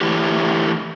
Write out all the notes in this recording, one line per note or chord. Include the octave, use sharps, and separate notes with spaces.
D3 E3 A3 E4 G4